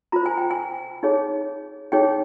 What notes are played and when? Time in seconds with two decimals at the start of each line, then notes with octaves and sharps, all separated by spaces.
0.12 F4 C5 A#5
0.26 G#5
0.38 G5
0.51 G#5
1.03 D#4 G#4 C#5
1.92 D#4 G#4 C#5 G5